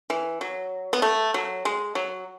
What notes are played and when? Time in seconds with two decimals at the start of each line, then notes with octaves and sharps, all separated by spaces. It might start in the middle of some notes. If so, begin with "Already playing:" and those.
0.10 E3
0.41 F#3
0.93 B3
1.02 A3
1.34 F#3
1.65 G#3
1.95 F#3